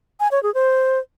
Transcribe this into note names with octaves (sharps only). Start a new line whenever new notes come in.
G#5
C#5
G#4
C5